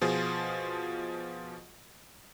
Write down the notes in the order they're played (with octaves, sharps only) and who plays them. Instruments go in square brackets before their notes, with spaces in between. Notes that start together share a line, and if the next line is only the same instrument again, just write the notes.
[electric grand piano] B2 F3 F4 G#4